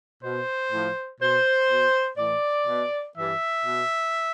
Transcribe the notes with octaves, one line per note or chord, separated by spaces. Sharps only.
B2 C5
A2 F3
B2 C5
B2
A2 E3 D5
B2
G2 E3 E5
B2